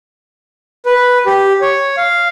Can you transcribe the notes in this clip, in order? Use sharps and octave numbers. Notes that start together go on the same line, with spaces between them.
B4
G4
C#5
F5